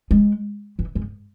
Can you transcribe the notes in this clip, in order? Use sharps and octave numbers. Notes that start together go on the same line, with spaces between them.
G#3
E3
G#2